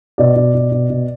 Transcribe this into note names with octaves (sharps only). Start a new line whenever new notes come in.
B2 D5
B2
B2
B2
B2